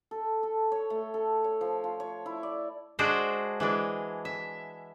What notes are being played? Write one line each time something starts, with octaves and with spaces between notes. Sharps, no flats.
A4
A4
C#5
A3
A4
C#5
F3
F4
C#5
E4
D5
G#3 D4 F#4 C5
E3 G#3 D4
E5